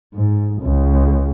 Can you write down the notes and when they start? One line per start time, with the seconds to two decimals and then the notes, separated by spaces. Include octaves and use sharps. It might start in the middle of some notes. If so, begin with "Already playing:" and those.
0.14 G#2
0.62 C#2